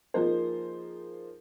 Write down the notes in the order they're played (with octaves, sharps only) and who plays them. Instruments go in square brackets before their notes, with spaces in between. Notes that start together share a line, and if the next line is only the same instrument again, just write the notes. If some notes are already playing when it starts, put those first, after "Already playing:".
[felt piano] F3 A#3 D#4 F4 G#4 C5